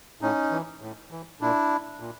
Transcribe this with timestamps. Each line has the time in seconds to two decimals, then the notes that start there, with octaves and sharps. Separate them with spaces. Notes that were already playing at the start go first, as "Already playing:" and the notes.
0.21 A2 C#4 D#4
0.51 E3
0.81 A2
1.11 E3
1.41 A#2 D4 E4
2.00 A#2